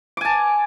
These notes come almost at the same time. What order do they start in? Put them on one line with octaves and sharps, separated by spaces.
D6 G#5 A5